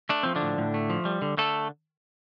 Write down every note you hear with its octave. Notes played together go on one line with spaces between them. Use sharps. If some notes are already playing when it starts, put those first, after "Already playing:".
A3 D4
F3 C4
D3 D4
A2
A2
A3
F3
G3
D3
D3 A3 A4